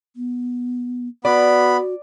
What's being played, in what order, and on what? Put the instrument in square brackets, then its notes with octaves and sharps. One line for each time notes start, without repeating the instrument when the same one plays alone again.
[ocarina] B3
[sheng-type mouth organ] B3 B5 [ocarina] F#4 [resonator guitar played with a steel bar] D5